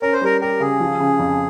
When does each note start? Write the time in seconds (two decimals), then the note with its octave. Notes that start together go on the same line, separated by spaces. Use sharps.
0.02 C#4 A#4
0.13 C5
0.21 G3 A#4
0.41 G4 A#4
0.60 C#3 G#4
0.80 F3
1.00 C#3
1.19 F2